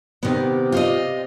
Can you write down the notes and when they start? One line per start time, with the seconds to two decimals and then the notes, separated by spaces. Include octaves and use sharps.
0.23 C3 D#3 B3
0.72 F4 C5 D#5